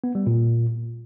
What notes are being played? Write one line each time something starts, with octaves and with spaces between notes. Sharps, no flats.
B3
G3
A#2